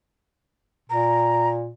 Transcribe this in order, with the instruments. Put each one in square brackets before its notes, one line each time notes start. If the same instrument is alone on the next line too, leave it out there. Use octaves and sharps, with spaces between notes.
[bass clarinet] A#2 [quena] A#5